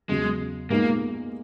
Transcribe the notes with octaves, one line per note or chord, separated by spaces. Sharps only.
E2 C#3 F#3 G#3
A#2 G#3 A#3 B3 D#4